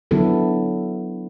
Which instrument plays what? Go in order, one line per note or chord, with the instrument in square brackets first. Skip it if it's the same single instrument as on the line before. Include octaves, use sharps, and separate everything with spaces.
[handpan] D3 F#3 B3 E4 A4